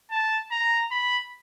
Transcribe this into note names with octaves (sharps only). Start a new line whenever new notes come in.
A5
A#5
B5